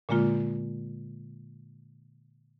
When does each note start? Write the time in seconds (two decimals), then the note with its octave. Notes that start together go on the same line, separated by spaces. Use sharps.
0.09 A#2 D3 G#3 A#3 F4